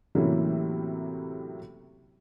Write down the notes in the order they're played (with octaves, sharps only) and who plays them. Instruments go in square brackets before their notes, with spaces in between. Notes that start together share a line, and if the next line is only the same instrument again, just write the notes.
[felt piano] A2 C3 E3 F#3 A#3 C#4